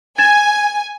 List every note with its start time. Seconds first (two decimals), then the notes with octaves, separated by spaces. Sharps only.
0.18 G#5 G#6 A6 E7